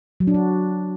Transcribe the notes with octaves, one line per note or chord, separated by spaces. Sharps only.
F#3
D4
F#4